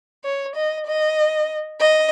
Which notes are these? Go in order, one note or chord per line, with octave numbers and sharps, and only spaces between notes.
C#5
D#5
D#5
D#5